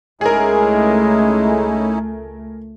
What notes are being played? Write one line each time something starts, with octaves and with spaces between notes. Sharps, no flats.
C#2 G#3 A3 C#4 D#4 E4 G#4 A#4